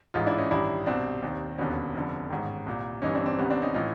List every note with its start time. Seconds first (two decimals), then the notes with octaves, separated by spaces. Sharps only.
0.14 A1 G#2 E3 D#4 F4
0.27 D4 E4
0.38 C#4 D#4
0.51 A1 G2 D#3 D4 E4
0.86 C2 B2 C4 D4
1.22 D#2 D#3
1.58 E1 D#2 D3 B3 C#4
1.95 F1 F2 D3
2.30 A1 G#2 D#3
2.66 C2 A#2
3.02 G1 G2 E3 C#4 D#4
3.14 C4 D4
3.26 C4 D4
3.38 C2 C3 D#3 B3 C#4
3.50 C4 D4
3.62 C#4 D#4
3.74 A2 E3 D#4 F4